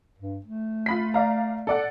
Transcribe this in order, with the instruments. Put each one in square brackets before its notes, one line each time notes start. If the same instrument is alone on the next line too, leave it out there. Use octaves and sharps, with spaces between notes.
[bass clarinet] G2
A3
[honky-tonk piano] F4 B5 B6
D5 F5 A#5
A4 D5 F#5